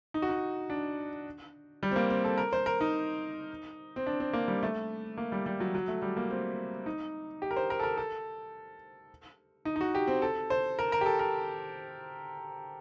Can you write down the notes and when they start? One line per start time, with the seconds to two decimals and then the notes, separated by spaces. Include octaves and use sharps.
0.14 D#4
0.22 F#4
0.29 D#4
0.70 D4
1.83 G3
1.91 C4
1.96 A#3
2.10 C4
2.24 A4
2.38 A#4
2.53 C5
2.66 A#4
2.81 D#4
3.96 C4
4.07 D4
4.20 C4
4.33 A#3
4.48 G3
4.63 A3
5.17 A#3
5.32 G3
5.46 G3
5.60 F#3
5.75 F#3
5.88 A3
6.02 G3
6.17 A#3
6.30 C4
6.86 D#4
7.42 G4
7.51 A#4
7.56 C5
7.70 A#4
7.80 A4
7.83 A#4
7.97 A4
9.65 D#4
9.76 D#4
9.81 F#4
9.95 G4
10.07 C4
10.22 A4
10.50 C5
10.79 A#4
10.92 A#4
11.01 G4
11.06 A4
11.19 A#4